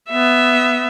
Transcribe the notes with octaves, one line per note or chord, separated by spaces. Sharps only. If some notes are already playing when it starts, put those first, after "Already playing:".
B3 E5